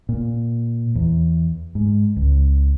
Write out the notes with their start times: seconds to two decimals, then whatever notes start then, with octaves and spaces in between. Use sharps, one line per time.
0.09 A#2
0.95 E2
1.75 G#2
2.16 C#2